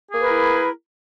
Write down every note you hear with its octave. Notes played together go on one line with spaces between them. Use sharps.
A#3 E4 G#4 A#4 B4